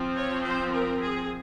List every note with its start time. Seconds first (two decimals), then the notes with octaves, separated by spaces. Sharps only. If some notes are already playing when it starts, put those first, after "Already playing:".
Already playing: F3 C4
0.15 C#5
0.44 C5
0.73 A#4
1.01 G#4